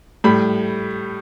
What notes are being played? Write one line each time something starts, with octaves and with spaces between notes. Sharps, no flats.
A2 G3 B5